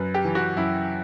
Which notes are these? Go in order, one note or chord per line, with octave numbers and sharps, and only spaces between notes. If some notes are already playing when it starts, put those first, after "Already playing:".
Already playing: F#2 B4
G4
E3
F#4
F#2 E4